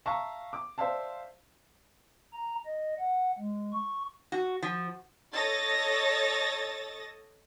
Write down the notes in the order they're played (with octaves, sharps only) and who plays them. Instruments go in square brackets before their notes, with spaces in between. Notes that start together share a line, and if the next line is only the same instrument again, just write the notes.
[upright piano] E5 F5 A5 A#5 C#6
D6
C5 D5 E5 F5 A5
[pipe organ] A#5
D#5
F#5
G#3
C#6
[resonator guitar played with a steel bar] F#4
F3
[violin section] A4 C#5 D#5 A6 A#6